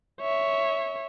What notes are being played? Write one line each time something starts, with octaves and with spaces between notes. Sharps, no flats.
C#5 E5